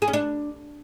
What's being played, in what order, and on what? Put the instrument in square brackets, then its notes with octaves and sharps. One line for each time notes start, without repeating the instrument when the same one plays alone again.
[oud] G#4
C#4
D4